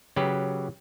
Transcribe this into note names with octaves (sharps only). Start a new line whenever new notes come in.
C#3 F#3 G4 B4